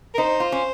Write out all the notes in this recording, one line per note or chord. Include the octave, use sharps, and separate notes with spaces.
A#4
D#4 C5
F4
C#4